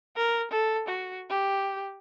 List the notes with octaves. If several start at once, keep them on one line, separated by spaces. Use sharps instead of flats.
A#4
A4
F#4
G4